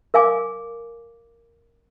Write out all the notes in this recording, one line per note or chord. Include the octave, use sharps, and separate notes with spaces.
A#4 F5 G#5 D6